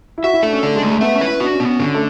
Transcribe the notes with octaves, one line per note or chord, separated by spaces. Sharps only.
E4
F#4 E5
E4
D4 A4
C#4
A3 D4
G#3
A3
G#3
B3 E5
C#4
B4
E4
D4 F#4
C#4
B3
C#4
D3 C#4
A3